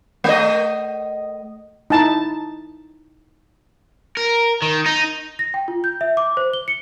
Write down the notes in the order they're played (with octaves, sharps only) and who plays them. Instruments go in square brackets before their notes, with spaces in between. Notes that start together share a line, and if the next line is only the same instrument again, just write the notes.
[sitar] A3 D#5
[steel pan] D#4 E4 A5
[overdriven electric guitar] A#4
D#3
D#4
[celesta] A#6
G5
F4
G6
E5
D6
C5
G7
C#7